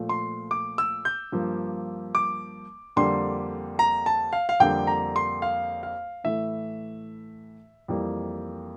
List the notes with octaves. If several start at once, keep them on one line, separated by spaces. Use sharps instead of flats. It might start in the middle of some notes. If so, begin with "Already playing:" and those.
Already playing: A#2 F3 A3
C6
D6
E6
G6
G2 F3 A#3
D6
F2 D3 G3 A#3 C6
A#5
A5
F5
F5
F2 D3 G3 A#3 G5
A#5
C6
F5
F5
A2 E3 A3 E5
F2 E3 G3 A#3